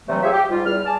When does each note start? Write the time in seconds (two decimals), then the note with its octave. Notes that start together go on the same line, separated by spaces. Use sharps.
0.09 G2 C3 E3 F#3 G3 A3
0.21 C4 F4 G4 G#4 C#5 E5
0.33 G4
0.49 G#2 G3 F4
0.65 E2 G3 F6
0.86 G#4 D5 A5